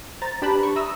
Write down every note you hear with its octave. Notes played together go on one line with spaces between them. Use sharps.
C5 A#5 A6
D4 G4 B4 A5 B5
C#6
E5 A#5 D#6 E6